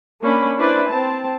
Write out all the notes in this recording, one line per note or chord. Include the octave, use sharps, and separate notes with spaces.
A#3 C#4 D4 B5
D4 E4 B4 C5 D5
C4 A5